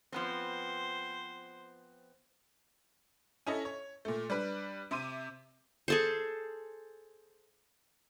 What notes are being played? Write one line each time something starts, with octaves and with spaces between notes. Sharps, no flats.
F3 B3 C4 C5
C#4 E4 A4 D#5
C#5
A#2 A3
G3 D4 B4
C3 E5 C6 D6 D#7
G#4 A4 C5